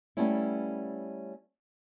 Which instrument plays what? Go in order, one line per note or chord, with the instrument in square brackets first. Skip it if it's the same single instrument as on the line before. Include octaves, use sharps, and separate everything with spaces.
[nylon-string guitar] G3 A3 B3 C#4 E4